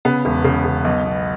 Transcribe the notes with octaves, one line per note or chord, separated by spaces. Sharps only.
C#3 B3
E1
C#3
C#3
B1
B2